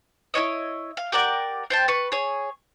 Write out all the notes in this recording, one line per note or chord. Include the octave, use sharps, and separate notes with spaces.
E4 F4 C#5 D#5
F5
G4 A#4 D5 F#5
C5 G5 A5
B4 C#6
G#4 C#5